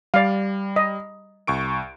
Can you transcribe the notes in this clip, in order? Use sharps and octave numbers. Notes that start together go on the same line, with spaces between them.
G3 D5 F5
D#5
C2 C#6 D7